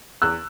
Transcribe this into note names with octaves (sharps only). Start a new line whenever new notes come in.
E2 E6 F#6